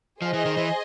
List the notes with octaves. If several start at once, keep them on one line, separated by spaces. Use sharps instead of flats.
F3 G#4 C5 D#5
E3
D#3
E3